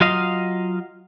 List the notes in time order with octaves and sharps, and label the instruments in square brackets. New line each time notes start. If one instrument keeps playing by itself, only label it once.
[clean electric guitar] F#3 F4 D#5 F5